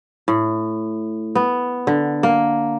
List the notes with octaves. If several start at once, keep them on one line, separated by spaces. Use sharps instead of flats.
A2
B3
D3
A#3